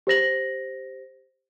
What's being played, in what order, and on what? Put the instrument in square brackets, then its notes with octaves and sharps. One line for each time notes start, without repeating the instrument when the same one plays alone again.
[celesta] G4 C5 A#6 F#7